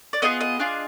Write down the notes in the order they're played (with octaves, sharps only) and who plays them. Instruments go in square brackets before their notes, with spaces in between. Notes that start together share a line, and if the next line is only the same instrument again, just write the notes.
[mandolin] D5
B3 F4 G#4 D#5
D#5
D4 F4 G#4